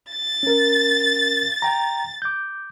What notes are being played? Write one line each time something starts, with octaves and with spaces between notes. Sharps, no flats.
A6
C#4 A#4
G5 A#5
D6 G6